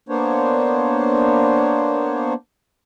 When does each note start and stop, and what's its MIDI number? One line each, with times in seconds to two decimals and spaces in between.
0.09 2.34 58
0.09 2.34 59
0.09 2.34 62
0.09 2.34 72
0.09 2.34 73